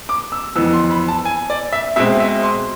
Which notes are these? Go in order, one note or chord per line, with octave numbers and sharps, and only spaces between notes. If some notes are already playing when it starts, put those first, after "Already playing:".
D6
E6
F2 E3 B3 E6
C6
B5
A5
G#5
D5
E5
B2 G#3 C4 E5
E5
C6